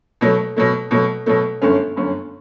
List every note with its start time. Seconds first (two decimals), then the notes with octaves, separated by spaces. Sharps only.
0.21 B2 F#3 A3
0.56 B2 F#3 A3
0.91 B2 F#3 A3
1.26 B2 F#3 A3
1.62 G1 F#2 D3 A3 C#4
1.96 G1 F#2 D3 A3 C#4